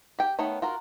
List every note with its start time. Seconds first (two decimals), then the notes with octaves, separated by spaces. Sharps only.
0.19 G4 G5
0.39 D#3 A3 B3 D#4 C#5
0.62 F4 F#4 A#4